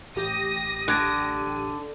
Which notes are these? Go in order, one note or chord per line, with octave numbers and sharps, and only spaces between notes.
A1 G4 D#6 A#6 D#7
D3 F#6 G#6 D7